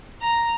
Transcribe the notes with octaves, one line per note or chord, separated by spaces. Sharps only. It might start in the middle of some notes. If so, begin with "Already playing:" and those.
A#5